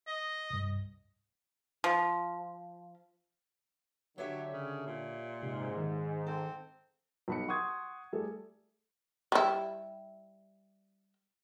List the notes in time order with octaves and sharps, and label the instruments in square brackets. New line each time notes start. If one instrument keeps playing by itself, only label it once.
[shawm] D#5
[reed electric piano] C2 G2
[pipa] F3
[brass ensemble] D3 [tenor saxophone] F#3 [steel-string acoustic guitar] G4 C#5 E5
[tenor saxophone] C#3
A#2
[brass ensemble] G#2 [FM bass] C3
[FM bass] D#3
[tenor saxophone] C4 [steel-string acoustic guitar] A4
[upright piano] B1 B5 C#7
F#5 C6 C#6 D#6 G#6
G3 A3 G#4 A4
[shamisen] G3 E4